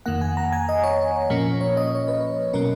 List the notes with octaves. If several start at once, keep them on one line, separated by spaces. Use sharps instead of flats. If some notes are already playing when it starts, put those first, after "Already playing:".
F2 D#3 A#3 F#5
G#5
A#5
G#5
D#5
C#5
A#2 F3 A#3 C#4
C#5
D#5
C#5
B4
B2 F#3 C#4 A#4